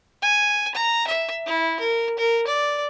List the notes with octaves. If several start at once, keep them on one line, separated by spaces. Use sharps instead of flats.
G#5
A#5
E5
E4
A#4
A#4
D5